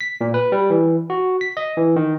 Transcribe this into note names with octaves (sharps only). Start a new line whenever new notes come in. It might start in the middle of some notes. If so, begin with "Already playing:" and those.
B6
A#2
B4
G3
E3
F#4
B6
D#5
E3
D#3